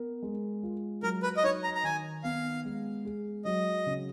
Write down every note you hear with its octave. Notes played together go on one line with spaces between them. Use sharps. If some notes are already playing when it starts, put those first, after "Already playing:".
Already playing: B3 A#4
G#3
F4
F#3 A#4
B4
D#5
D#4 C#5
A#5
A#5
D#3 G#5
B3 F5
G#3
G#4
F#3 D#5
C#3